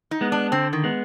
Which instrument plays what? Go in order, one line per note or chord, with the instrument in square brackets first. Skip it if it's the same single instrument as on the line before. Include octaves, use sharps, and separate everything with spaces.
[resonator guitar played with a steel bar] D#4
[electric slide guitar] G#3 B3
[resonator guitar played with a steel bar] D4
[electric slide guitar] D3 [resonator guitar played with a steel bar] C4
[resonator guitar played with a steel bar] D#3
[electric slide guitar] G#3 B3